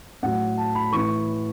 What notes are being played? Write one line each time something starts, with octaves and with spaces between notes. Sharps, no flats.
A2 F#3 F#5
A5
B5
A2 E3 C#6